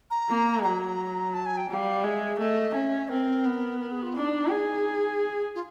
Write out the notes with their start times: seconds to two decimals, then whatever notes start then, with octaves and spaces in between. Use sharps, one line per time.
0.11 A#5
0.29 A#3
0.63 F#3 A#5
1.34 A5
1.46 G#5
1.57 G5
1.69 G3 G5
1.73 F5
2.04 G#3 E5
2.39 A3 D#5
2.74 C#4 E5
3.09 C4 A#4
3.45 B3
3.80 A#4
3.92 G#4
4.03 F4
4.15 D4 E4
4.19 D#4
4.50 G#4
5.55 F4